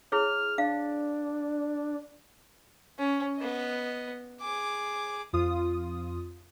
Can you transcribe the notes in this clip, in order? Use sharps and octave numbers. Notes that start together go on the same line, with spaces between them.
E4 G#4 C#5 F6
D4 F5
C#4
B3 D#5
G#4 D6
F2 F4 D#6